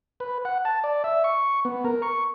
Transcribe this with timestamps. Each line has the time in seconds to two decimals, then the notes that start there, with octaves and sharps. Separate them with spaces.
0.20 B4
0.45 F#5
0.65 A5
0.84 D5
1.04 E5
1.24 C#6
1.65 B3
1.85 A#4
2.02 C#6